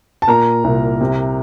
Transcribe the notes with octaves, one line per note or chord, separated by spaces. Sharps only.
A5
A#2 A#4 A#5
C2
C3